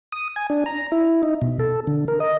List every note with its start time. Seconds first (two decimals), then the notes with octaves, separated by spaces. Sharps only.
0.12 D#6
0.36 G#5
0.50 D4
0.66 A#5
0.92 E4
1.23 D#4
1.42 B2
1.59 A4
1.87 D3
2.08 A#4
2.20 D#5